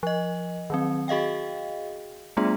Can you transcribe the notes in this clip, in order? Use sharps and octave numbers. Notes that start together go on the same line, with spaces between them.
F3 D#5
D#3 F#3 C4
F#4 G#4 D#5 F5 G5
G3 A3 B3 D4 F4 G#4